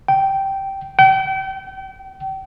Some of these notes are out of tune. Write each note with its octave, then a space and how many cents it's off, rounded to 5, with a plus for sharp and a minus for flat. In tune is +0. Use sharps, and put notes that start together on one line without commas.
G5 -10
G5 -35